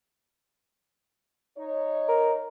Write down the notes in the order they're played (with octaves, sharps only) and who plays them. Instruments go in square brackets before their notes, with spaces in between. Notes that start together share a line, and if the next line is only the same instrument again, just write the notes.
[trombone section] D#4 [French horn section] C#5
[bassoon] A#4